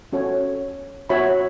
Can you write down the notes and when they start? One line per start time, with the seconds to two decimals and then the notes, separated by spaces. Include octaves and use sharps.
0.13 C#4 F#4 A4 C#5
1.10 F#4 C#5 E5 B5